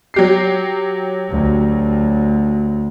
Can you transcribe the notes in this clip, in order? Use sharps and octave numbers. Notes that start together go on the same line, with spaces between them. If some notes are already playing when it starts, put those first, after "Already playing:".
F#3 G4 C7
D2